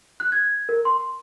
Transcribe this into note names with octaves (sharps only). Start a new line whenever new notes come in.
F#6
G#6
A#4
C6